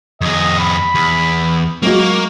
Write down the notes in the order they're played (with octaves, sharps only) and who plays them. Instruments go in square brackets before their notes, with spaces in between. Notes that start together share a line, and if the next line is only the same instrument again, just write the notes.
[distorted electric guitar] F2 G#4 [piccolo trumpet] D#5
[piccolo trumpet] B5
[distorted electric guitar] E2
[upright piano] F#3 G#3 F#4 [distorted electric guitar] A#3 [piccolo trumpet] C#6